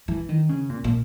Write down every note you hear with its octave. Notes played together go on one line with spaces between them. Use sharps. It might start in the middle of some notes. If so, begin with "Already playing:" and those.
E3
D#3
C#3
A#2
A#2